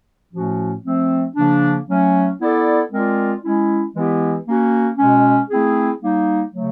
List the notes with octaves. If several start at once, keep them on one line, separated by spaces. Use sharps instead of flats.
A2 F3 A3 C#4 F#4
F3 A3 C4
C#3 F3 A#3 D4
F#3 A3 C#4
B3 E4 A4 D5
G#3 C4 F4 A#4 D5
G#3 C#4 E4
E3 G#3 B3 E4 G4
A#3 C#4 F#4
B2 G#3 C#4
A3 C4 E4 G#4
G3 A#3 D#4
C#3 F#3 A3